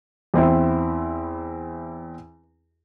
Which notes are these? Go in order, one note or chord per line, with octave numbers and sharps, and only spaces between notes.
E2 C4 E4